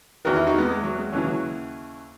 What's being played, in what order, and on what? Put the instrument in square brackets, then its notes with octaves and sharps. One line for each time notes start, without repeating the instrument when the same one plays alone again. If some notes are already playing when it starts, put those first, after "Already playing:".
[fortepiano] E2 D#3 F#4 A#4
E4 G#4
D#4 F#4
G#3 B3
G#3
F#3
G#3
D#2 C#3 E3 F#3
F#3